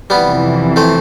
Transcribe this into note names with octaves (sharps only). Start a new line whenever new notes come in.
F2 C3 E3 G3 B3
A3 C4